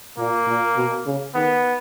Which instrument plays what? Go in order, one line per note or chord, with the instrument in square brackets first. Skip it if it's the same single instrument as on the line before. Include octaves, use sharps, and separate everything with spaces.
[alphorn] A#2 [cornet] A#3
[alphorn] A#2
B2
C#3
[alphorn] D#3 [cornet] B3